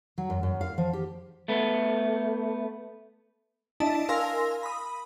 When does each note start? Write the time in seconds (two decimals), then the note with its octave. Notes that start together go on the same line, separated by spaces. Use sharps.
0.18 F#3
0.30 F#2
0.43 F#2
0.61 F5
0.78 F3
0.93 G4
1.48 A3 B3
3.80 D4 E4 D#5 A5
4.09 A#4 F5 G#5 C6 E6 A#6
4.63 B5 D#6